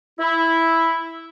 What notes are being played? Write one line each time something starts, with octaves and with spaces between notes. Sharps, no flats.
E4